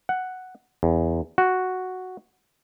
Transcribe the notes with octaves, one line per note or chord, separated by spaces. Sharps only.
F#5
E2
F#4